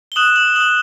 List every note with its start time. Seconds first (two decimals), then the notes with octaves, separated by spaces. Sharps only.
0.12 G7
0.16 D#6 F#6 E7 F#7
0.36 E7 F#7
0.55 D#6 F#6 E7 F#7